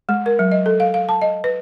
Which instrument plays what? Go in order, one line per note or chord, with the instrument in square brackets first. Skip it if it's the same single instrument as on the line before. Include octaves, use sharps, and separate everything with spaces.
[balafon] G#3
A#4
F#3
D#5
A4
F5
F5
A5
D#5
B4